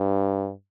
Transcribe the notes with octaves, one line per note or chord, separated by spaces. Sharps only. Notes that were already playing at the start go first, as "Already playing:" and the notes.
Already playing: G2